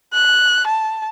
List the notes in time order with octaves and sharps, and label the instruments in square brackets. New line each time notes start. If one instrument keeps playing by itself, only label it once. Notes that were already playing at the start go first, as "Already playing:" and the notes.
[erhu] F#6
A5